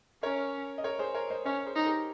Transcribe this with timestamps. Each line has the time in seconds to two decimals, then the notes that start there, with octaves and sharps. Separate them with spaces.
0.23 C#4 A#4 C#5
0.78 D#5
0.84 A#4 C#5
0.99 G#4 C5
1.14 A#4 C#5
1.30 C5 D#5
1.46 C#4 A#4 C#5
1.66 G#4 C5
1.76 D#4
1.86 G4 A#4